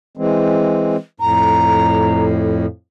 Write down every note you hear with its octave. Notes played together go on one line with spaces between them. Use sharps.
E3 G#3 C4
F2 A2 A#5